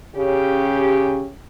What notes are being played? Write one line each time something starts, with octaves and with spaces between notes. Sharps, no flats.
C#3 C#4 G4